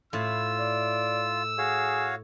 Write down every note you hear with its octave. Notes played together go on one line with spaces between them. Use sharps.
A2 E4 F4 E6
D5
F#4 G#4 C#5 F5